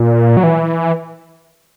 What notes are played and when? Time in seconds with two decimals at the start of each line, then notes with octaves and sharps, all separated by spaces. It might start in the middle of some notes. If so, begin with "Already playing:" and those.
Already playing: A#2
0.37 F#3
0.43 E3